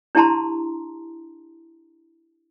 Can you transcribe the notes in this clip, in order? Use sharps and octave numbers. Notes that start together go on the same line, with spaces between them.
D4 E4 G4 A5 A#5 C6